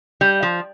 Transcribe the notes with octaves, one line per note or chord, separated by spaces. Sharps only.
G3
F3